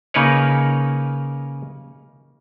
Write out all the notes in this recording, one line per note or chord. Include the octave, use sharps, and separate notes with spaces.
C#3 A#3 D#4 A#4 B4 C#5